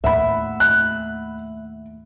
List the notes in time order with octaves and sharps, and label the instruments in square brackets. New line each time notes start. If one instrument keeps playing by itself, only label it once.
[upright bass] D#2 A2 [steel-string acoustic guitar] E5 [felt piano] F#5 B5
[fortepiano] F#6